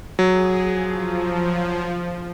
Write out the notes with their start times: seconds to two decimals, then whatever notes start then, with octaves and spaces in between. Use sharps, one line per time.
0.19 F#3 G#4
0.69 F3